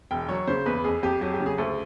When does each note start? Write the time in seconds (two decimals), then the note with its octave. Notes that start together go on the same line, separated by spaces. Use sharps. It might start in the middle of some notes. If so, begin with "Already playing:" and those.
0.11 E1 G5
0.29 F#3 C#5
0.47 C#3 C5
0.66 E2 B4
0.84 F2 G#4
1.03 F2 G4
1.21 F#3 G4
1.34 G4
1.40 C#3
1.46 G#4
1.58 D2 A4